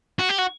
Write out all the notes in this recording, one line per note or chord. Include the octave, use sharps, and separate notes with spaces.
F#4
G4
F#4